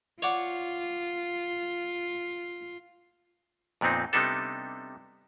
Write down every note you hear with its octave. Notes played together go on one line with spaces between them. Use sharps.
F4 C#5 D5 F#5
F2 A#2 B3 C4 D#4
C3 G3 B3 D4 D#4 A4